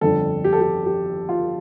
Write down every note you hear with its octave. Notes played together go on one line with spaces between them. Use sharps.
G1 F2 D3 A4
G4
A4
G4
G4
F4